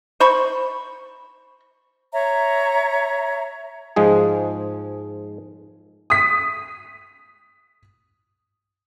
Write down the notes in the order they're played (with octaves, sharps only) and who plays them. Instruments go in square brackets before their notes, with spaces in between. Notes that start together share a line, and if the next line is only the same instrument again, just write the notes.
[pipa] C5 B5 C#6
[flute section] C#5 E5 A#5
[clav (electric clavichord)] G#2 F3 G#3 G#4
[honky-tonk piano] D#6 B6